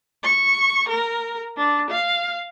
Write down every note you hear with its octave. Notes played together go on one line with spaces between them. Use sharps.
C#6
A#4
D4
F5